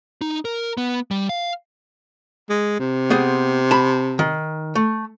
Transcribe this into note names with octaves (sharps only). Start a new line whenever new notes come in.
D#4
A#4
B3
G3
F5
G#3
C3
B3 C4 G#4
A5 B5
D#3
A3